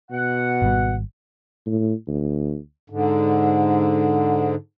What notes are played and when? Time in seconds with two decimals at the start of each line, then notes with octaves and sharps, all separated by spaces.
0.11 B2 F#5
0.62 G#1 G3
1.66 A2
2.08 D2
2.90 G#2 D3